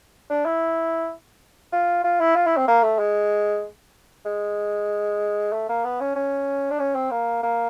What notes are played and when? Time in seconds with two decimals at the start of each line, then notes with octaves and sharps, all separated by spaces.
0.30 D4
0.46 E4
1.72 F4
2.04 F4
2.21 E4
2.36 F4
2.47 E4
2.57 C4
2.68 A#3
2.83 A3
2.99 G#3
4.26 G#3
5.53 A3
5.69 A#3
5.84 B3
6.01 C#4
6.16 C#4
6.71 D4
6.79 C#4
6.95 C4
7.11 A#3
7.43 A#3